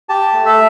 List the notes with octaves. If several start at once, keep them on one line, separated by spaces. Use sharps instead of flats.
G4 A5
A3
E5